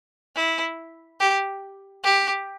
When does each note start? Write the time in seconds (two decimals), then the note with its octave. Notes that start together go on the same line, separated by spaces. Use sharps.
0.35 E4
1.20 G4
2.04 G4